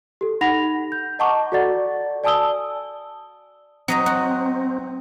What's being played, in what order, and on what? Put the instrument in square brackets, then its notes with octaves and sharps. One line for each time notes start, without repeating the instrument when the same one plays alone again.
[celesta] G4 A4
D#4 F#5 B5 A#6 F7
G6
D#5 F#5 A5 A#5 C#6 D6
F#4 A4 D5 F#5 A6
D5 G#5 A5 D#6 E6 G7
[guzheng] F#3 D#5 A#5 [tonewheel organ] C4
[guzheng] F#4